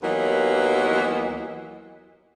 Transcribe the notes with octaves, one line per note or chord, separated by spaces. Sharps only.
D#2 E3 F#3 A#3 B3 D#5